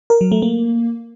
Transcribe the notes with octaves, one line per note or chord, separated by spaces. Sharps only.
A#4
F#3
A3
A#3